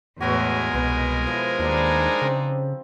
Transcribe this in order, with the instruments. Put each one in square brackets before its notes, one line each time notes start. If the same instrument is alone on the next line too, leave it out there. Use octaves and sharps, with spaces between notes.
[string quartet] E2 A2 [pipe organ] G#3 A#4 G#5 [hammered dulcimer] F#4 B4 C#5
[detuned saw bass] C2 [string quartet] B2 [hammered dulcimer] B4
[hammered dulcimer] F3 E4
[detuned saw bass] D#2 [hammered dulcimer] F3 G3 [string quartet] D4 D#4 G#4
[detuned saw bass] C#3 [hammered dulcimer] C4